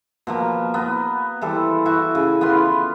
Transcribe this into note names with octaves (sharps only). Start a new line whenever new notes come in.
B2 F3 A#3
B3 A#5
E3 G3 A4 C5
E4 F#4 C#6
C#3
B3 F4 B4 C6